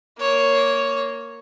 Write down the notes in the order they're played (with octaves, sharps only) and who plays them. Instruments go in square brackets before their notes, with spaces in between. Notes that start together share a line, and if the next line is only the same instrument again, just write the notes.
[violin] A#3 C#5